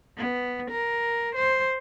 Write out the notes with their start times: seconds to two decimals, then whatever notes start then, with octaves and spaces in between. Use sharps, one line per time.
0.17 B3
0.71 A#4
1.35 C5